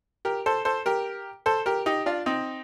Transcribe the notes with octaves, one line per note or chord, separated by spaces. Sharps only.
G4 A#4
A4 C5
A4 C5
G4 A#4
A4 C5
G4 A#4
D#4 G4
D4 F4
C4 D#4